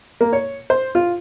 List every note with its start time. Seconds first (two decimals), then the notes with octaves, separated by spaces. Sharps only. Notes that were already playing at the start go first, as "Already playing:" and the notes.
0.21 A#3
0.33 C#5
0.70 C5
0.95 F4